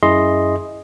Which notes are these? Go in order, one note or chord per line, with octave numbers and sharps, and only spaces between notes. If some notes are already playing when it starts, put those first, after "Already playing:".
F#2 E4 G#4 D#5 C6